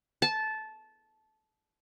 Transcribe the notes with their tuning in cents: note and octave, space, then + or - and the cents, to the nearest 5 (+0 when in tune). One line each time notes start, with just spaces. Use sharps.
A5 -15